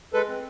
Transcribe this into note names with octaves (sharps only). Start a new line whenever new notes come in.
G#3 A4 B4
C4